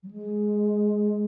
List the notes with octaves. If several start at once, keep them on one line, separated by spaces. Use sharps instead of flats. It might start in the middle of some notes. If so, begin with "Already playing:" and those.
F#3
G#3